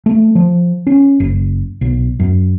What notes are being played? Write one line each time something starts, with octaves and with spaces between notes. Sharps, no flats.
A3
F3
C#4
F#1
B1
F#2